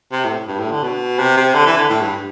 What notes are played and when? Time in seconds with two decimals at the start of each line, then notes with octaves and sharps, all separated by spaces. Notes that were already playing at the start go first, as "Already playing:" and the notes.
0.12 C3
0.24 A2
0.48 G2
0.59 A2
0.71 D3
0.83 B2
1.19 C3
1.37 C3
1.54 D3
1.66 E3
1.77 D3
1.90 A2
2.01 G2